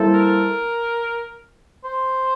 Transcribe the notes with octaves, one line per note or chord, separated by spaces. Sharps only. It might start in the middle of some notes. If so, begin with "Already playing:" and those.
Already playing: G3 A#3 E4 A4 C5
A#4
C5